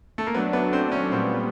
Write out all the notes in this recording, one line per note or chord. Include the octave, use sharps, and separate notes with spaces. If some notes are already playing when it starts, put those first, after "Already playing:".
A3
A#3
F#3 A3 B3 D4
B3
C4
C#4
A#2 G3 B3 C4